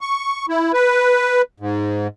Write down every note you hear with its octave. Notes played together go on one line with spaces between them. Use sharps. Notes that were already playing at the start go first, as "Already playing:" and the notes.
C#6
E4
B4
G#2